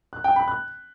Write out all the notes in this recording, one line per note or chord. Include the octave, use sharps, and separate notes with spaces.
F#6
G5
B5
F#6